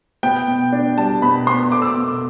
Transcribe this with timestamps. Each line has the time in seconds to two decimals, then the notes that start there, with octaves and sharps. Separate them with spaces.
0.23 B3 G5
0.48 B2
0.72 D4
0.97 G3 A5
1.22 B2 B5
1.47 B3 C6
1.72 A3 D6
1.82 E6
1.92 B2 D6